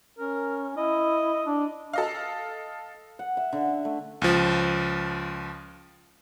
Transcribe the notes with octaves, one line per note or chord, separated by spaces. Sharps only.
C#4 A#4
E4 D#5
D4
A4 D#5 F5
F#5
E5
D3
A3
C#2 F3